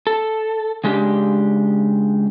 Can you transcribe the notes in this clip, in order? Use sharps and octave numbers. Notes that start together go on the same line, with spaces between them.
A4
C#3 G#3 D4 G4